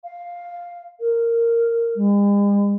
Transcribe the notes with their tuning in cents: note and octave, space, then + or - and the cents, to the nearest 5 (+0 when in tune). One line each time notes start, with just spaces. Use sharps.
F5 +5
A#4 -10
G#3 -45